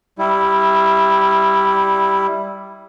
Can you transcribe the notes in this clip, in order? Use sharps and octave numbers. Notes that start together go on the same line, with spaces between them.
G3 E4